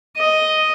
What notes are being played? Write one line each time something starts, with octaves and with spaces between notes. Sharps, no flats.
D#5